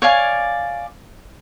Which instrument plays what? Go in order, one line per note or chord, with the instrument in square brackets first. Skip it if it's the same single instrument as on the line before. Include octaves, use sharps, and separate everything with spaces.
[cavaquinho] C#5 D5 F5 G#5